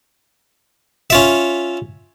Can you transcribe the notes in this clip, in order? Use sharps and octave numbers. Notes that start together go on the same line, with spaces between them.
C#4 F4 E5